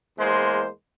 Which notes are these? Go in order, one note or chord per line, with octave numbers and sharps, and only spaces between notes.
E2 G#3 A#3 C5